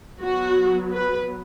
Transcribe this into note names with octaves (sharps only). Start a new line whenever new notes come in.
F#3 B3 F#4
B4